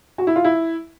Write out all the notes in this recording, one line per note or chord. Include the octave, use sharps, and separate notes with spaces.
F#4
E4
F4
E4